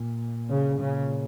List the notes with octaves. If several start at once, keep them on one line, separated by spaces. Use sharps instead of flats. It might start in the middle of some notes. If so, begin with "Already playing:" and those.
Already playing: A#2
C#3
A#2 C#3